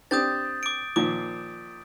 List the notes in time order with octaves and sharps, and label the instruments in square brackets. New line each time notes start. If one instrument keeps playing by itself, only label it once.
[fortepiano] C4 D4 G4 [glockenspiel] D#6 G6 A6
[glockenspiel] D6 D7
[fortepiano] A#2 D#3 F3 [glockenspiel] D6